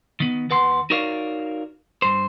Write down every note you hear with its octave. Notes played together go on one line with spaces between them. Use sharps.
D#3 B3
D#2 B4 F#5 C6
D#4 F#4 A#4 C#5 D5 F5
G2 C5